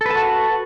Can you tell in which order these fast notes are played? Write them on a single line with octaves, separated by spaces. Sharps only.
A4 B4 A5 F#4